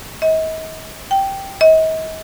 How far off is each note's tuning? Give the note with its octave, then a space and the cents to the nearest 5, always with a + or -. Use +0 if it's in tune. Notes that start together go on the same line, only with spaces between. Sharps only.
D#5 +40
G5 -5
D#5 +40